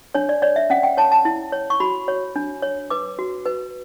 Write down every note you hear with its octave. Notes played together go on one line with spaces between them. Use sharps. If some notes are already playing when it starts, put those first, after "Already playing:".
D4 C#5
D5
C#5 D5
E5
C#4 F#5
G5
C#5 A5
A5
E4
C#5
C#6
F#4 B5
C#5
D4
C#5
B4 D6
F#4
B4